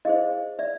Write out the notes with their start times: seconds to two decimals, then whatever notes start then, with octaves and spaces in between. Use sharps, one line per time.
0.05 E4 G#4 C5 D#5 F5
0.59 D5 E5